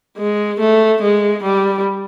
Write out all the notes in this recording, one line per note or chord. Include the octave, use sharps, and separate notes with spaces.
G#3
A3
G#3
G3